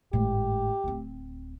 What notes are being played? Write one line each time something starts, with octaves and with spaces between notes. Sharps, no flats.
G#1 A2 G4
D1 C4